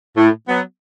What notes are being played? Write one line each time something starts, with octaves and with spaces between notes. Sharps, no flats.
A2
F#3 B3